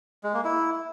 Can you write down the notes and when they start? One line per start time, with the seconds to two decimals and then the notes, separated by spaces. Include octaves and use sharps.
0.23 G#3
0.34 A#3
0.44 E4